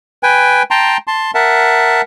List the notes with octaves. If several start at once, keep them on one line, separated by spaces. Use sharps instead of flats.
B4 G5 G#5
G5 A5 A#5 C6
A5 C6
A#4 E5 F#5 A5